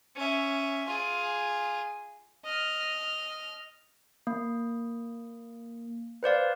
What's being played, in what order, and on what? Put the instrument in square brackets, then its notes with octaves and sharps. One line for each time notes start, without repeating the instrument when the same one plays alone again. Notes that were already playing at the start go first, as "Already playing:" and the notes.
[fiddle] C#4 E5
F4 G#4
D#5 F6
[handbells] A#3
B4 C5 D5 F5